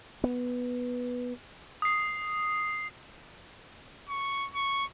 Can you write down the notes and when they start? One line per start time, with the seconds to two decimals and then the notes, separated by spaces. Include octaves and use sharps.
0.24 B3
1.82 D#6 C7
4.09 C#6
4.54 C#6